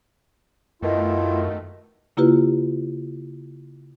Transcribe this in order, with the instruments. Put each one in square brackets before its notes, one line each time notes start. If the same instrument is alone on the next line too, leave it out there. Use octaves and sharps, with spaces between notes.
[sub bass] F#2 [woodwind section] B2 D#3 [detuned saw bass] A3 [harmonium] E4 F4
[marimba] C#3 A#3 E4 F4 G4 B4